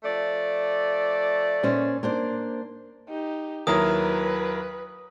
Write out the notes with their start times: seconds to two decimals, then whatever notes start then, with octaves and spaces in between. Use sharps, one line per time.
0.04 F3 A3 D5
1.63 A#2 C#4 C5
2.03 A#3 D4 C5
3.08 D#4 G4
3.67 D#2 F#3 E4 A#4 B4 D#6